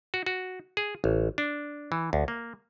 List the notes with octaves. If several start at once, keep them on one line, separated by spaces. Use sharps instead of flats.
F#4
F#4
G#4
A1
D4
E3
D2
A#3